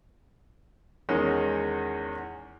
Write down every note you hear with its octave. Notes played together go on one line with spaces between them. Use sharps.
E2 D#3 G#3 C#4